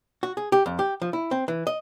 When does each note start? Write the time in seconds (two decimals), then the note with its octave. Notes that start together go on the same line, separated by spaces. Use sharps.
0.23 F#4
0.37 G#4
0.52 G4
0.66 F2
0.79 G4
1.02 F3
1.13 E4
1.31 C4
1.48 E3
1.67 D#5